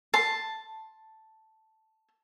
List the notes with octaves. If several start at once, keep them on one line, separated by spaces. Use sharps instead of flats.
A5 C6